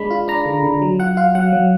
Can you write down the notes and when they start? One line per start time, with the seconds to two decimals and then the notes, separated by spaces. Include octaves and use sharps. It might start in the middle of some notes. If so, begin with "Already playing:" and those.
Already playing: G#3 D4 B5
0.11 F4
0.28 D4 A#5
0.46 D3
0.63 D3
0.82 F#3
1.00 F4 F#5
1.17 F4 F5
1.35 F#3 F#5
1.52 F#3